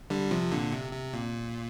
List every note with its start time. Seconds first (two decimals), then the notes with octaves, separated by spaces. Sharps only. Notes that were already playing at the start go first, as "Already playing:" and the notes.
0.10 D3 G3
0.31 C3 F3
0.52 A#2 D3
0.72 C3
0.93 C3
1.13 A#2